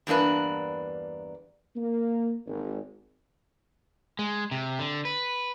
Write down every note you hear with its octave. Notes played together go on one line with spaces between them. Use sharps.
E2 G2 A#3 D4 B4
A#3
G#1
G#3
C3
D3
B4